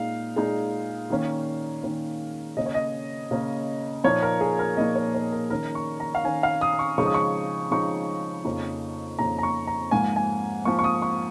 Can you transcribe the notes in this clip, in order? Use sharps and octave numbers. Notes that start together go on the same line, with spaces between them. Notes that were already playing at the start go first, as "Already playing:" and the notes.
Already playing: A#2 G#3 D#4 F5
A#2 G#3 D#4
D#3 A#3 C#4
D#3 A#3 C#4
C#3 A#3 C#4 D#5
C#5
D#5
C#3 A#3 C#4
A#2 F3 A#3 D#4 C#5
A#4
G#4
A#4
A#2 F3 A#3 D#4 D#5
C#5
C#5
A#4
D#3 C#4 A#4
C#6
A#5
F5
D#3 C#4 G#5
F5
D#6
C#6
C#3 F3 G#3 D#4 C#6
D#6
C#6
C#3 F3 G#3 D#4 C#6
F2 C#3 A#3 D#4
F2 C#3 A#3 D#4 A#5
A#5
C#6
A#5
G#2 F3 A#3 G#5
G#5
G#2 F3 A#3 C#6
C#6
D#6
C#6